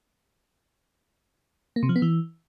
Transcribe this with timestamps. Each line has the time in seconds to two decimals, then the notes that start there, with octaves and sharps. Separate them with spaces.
1.76 A#3
1.83 C3
1.89 F3
1.96 B3
2.02 E3